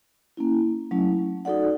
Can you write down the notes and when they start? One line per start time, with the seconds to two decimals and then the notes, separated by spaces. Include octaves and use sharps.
0.37 A#3 C#4 E4
0.91 F#3 A3 C#4 E4
1.45 D#4 F#4 A4 D5 F#5